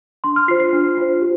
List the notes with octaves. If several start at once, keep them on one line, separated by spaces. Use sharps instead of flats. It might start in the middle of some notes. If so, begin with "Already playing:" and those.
D4 C6
F6
F4 C5 C7
C7
D4
F4 C5
G4